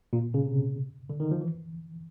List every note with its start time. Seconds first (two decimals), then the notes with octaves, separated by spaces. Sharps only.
0.13 A#2
0.34 C#3
0.45 C3
1.10 D3
1.20 D#3
1.31 F3
1.41 E3